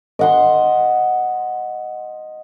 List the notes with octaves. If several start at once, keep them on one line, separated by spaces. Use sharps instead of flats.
D#5 F#5 C6